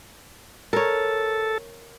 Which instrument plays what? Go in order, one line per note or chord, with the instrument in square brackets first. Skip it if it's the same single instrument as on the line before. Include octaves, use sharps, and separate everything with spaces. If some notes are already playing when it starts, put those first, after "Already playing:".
[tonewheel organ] A4 [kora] A#4 C#5